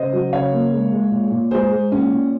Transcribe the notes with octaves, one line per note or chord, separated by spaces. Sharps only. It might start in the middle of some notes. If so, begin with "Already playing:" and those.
Already playing: C#3 C5 D#5
F#3
C#3 C#5 F5
A#3
G#3
G#3
A#2
A#2
G#3 G#4 C5
G#3
A#2 C#4
A#2